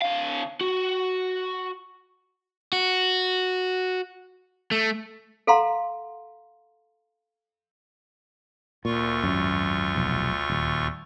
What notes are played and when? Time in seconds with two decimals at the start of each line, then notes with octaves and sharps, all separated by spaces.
0.02 D3 F5
0.61 F#4
2.73 F#4
4.71 A3
5.47 A4 F5 F#5 A#5 C6
8.85 D2 A#2 F4 C#6
9.23 G#1 F#2
9.95 F1 B1
10.50 D#1